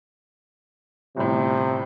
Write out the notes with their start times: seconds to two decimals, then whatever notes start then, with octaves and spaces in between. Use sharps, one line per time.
1.17 G1 A2 C3